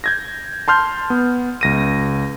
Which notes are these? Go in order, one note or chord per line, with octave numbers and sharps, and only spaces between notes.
G6 G#6 A#6
A5 C6 F6 G6
B3
C#2 A#6 D#7